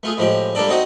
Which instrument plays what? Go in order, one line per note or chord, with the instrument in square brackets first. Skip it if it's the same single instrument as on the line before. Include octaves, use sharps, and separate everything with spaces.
[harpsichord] A3 F4 G#4
A2 F3 G#3 G4
G3 A#3 D4 A4 D5
C4 D#4 F#4 D#5